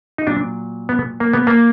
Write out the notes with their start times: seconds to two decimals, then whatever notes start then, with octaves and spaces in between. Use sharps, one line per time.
0.18 D#4
0.27 A#2 F#3 D4
0.89 B3
1.20 A#3
1.34 B3
1.47 A#3